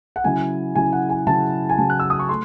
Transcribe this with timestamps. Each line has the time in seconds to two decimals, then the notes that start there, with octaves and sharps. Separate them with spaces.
0.16 F#5
0.24 C#3 F#3 C#4 E4 G#5
0.75 C#3 F#3 C#4 E4 G#5
0.93 F#5
1.09 G#5
1.27 C#3 F#3 C#4 E4 A5
1.69 G#5
1.78 C#3 F#3 C#4 E4 A5
1.90 F#6
2.00 E6
2.10 D#6
2.19 C#6
2.29 A3 C6